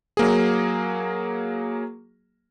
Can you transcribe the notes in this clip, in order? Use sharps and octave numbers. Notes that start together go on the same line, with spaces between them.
F#3 A#3 G#4